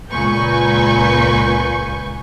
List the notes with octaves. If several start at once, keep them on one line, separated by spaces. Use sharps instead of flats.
C#2 A#2 B4 G#5 C#6 G6